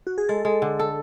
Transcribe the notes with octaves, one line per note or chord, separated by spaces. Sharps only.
F#4
G#4
G#3 A4
G#3
D3
A4